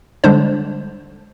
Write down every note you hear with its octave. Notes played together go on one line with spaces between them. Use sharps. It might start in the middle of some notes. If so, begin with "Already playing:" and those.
D3 G3 G#3 D4 C5